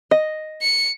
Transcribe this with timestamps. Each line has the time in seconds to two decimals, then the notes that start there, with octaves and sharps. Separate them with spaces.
0.11 D#5
0.62 C#7